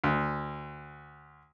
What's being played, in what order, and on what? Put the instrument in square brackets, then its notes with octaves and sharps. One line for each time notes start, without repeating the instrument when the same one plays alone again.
[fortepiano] D2